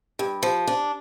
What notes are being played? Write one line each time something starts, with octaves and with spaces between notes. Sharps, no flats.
G2
F3
D4